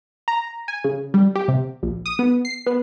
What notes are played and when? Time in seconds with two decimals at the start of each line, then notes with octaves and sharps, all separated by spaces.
0.28 A#5
0.68 G#5
0.84 C#3
1.14 G3
1.35 G4
1.48 C3
1.83 A#1
2.06 D#6
2.19 B3
2.45 C7
2.66 B3